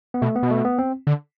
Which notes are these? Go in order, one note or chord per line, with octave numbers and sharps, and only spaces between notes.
B3
B2 A3
B3
B2
A3
B3
C4
D3